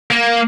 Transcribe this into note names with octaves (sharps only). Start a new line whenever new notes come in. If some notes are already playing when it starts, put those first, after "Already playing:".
A#3